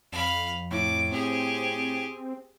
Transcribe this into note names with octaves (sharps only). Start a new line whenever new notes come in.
F2 F5 B5
A2 D6
C4 G4 G#4